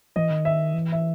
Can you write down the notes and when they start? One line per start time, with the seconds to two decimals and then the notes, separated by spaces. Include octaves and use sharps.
0.16 E3 D#5
0.31 D#3
0.45 E5
0.74 E3
0.92 E5